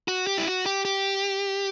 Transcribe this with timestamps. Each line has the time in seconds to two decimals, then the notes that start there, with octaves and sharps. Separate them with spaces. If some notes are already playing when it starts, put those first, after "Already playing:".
0.08 F#4
0.27 G4
0.38 E4
0.47 F#4
0.66 G4
0.85 G4